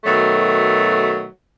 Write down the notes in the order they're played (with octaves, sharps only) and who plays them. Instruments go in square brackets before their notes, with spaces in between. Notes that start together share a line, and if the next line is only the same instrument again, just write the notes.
[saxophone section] B2 D#3 F#3 A3